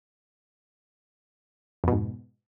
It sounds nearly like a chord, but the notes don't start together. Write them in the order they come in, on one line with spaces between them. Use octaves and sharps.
F2 B2 G#2